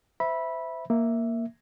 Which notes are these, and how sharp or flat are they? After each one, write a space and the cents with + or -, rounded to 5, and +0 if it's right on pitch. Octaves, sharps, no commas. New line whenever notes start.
C5 -30 E5 +0 B5 -15
A#3 +0 E5 +0